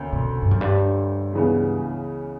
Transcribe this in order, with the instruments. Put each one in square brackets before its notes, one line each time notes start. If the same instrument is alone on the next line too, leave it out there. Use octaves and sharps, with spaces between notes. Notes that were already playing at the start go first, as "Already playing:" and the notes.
Already playing: [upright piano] D2 D3 A#3 C#4
[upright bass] B2
G2
F#2
G2
[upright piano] C#2 C#3 E3 B3